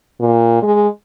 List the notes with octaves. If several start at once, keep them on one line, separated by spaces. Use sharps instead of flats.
A#2
G#3